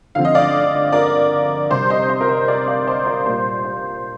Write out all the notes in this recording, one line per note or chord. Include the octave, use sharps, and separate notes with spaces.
D3 F3 C4 F5
D#5
D5 F5
A#4 D5
C3 G3 C4 C5
C5 D#5
C5
A#4
C5
A#4 D5
D5 F5
C5 D#5
A#4 D5
A#2 G3 A#3 C5
C5